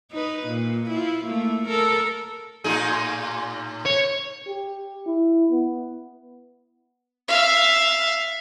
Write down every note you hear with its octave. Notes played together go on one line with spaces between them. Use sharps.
D#4 B4
A#2
E4 F4
A3 A#3
A4 A#4
A2 D#4 G#4
C#5
G4
E4
B3
E5 F5